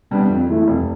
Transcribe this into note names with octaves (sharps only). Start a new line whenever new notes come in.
C3 G3 B3 D4
F2
E3 A3 E4
F1